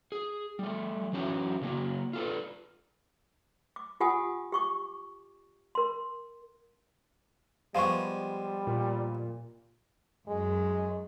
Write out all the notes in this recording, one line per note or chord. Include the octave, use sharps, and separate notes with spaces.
G#4
G3 A3
E3 F#3 C#4 G4
C#3 F#3 A#3
F4 A4 B4
D6
F4 G4 F#5 G#5 D#6
G4 C#6 D6
A#4 C6
F3 G3 G#3 B3 F5 C#6
A#2
F#2 G#3